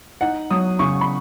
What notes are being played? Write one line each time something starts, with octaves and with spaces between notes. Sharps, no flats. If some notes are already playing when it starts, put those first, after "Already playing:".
D#4 F#5
F#3 D#6
C#3 C#6
B5